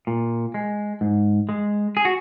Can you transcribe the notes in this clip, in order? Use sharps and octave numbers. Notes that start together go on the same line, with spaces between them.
A#2
G#3
G#2
G#3
G#4
F#4